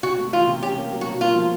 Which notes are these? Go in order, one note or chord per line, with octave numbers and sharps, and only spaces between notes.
C3 F#4
A3
E3 F4
C3
C#4 G4
A#3
F#3
F#4
B2
A#3 F4
F3